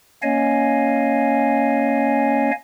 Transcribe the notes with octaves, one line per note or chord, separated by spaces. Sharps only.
A#3 C#4 C#5 D#5 F5 G#5